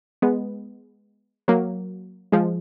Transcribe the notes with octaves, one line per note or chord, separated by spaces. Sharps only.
G#3 B3
F#3 A#3
F3 G#3